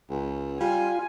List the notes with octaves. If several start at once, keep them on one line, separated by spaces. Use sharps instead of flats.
C#2
G3 F4 G#5